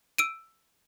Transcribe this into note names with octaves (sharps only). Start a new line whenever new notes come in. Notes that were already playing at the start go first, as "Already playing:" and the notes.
E6 D7 D#7